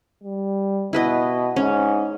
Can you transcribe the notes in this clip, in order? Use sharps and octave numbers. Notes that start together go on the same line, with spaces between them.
G3
B2 E4 B4 D#5
G#2 C#4